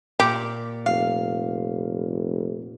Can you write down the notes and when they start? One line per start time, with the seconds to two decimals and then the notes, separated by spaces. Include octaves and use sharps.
0.20 A#2 G4
0.86 F1 F5